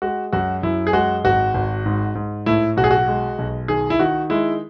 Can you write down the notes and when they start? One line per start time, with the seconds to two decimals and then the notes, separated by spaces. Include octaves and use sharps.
0.02 G#3 F#4
0.32 F#2 F#4
0.63 F#2 E4
0.87 G#4
0.93 G#3 F#4
1.24 G#1 F#4
1.55 G#1
1.86 G#2
2.15 G#2
2.46 A2 E4
2.76 B1 F#4
2.84 G#4
2.91 F#4
3.08 G#3
3.38 B1
3.68 D#3 G#4
3.90 E4
3.99 D#3 F#4
4.30 G#3 E4